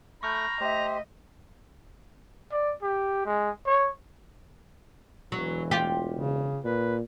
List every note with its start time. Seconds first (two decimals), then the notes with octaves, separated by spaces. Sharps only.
0.23 A3 A#5 B5 C#6 F6 G6
0.61 A3 G4 C5 D#5 E5
2.52 D5
2.82 G4
3.25 G#3
3.66 C#5
5.32 E1 E3 F#3
5.71 F4 G4
6.13 C#3
6.64 A#2 B4